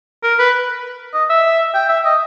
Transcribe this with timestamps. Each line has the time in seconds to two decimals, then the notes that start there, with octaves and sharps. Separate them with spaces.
0.23 A#4
0.39 B4
1.13 D#5
1.30 E5
1.74 G5
1.89 E5
2.05 D#5